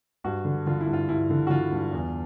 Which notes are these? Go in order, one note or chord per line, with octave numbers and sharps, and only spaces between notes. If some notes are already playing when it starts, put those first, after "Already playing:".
G2 F#4
D3
D3 F4
E4
G2
F4
G2 E4
D3
F#4
D3 F4
G2
E2